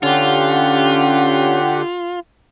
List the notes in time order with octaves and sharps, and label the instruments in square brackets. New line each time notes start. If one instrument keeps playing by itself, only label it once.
[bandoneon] D3 [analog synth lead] C#4 [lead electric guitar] F4 [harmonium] G4 F#5